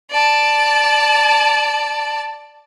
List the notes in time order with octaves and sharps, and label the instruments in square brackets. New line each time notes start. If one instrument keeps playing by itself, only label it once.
[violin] D5 A5